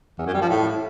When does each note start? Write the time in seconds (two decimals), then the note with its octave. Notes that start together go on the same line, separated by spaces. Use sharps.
0.18 E2
0.26 F#2
0.34 G3
0.42 F3
0.49 A2